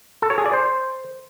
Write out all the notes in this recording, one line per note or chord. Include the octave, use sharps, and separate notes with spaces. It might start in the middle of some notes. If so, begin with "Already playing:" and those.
A4
C#5
G#4
D5
C5